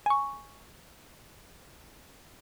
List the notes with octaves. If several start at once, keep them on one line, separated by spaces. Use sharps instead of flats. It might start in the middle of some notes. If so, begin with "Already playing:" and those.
G#5 C#6